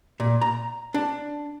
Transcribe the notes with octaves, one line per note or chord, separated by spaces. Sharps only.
A#2
A#5
D4